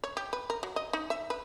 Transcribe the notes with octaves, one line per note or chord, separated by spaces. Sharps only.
C#5
G4
B4
A#4
F#3
D#5
D#4
E5
B4